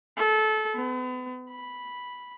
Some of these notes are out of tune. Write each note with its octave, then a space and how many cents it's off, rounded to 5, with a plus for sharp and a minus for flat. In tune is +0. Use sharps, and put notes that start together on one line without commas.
A4 -25
B3 +40
B5 -5